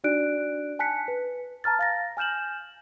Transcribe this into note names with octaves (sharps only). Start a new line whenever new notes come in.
D4 D#4 F#4 D5 F#6 D7
G#5 A5 F#6 B6 C#7
B4
A5 A#5 F6 A6
F5 A6 A#6
G#5 F6 G6 E7 F#7